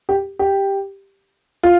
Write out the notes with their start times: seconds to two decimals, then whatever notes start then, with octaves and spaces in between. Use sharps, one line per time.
0.09 G4
0.39 G4
1.63 F4